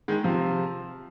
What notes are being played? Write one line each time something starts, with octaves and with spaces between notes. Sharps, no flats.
D#3 G#3
C3 F3